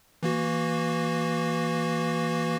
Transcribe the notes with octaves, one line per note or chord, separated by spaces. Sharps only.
E3 A#3 F#4